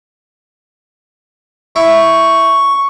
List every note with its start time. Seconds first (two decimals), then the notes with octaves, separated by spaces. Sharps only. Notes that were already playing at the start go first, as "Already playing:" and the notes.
1.76 E4 C#6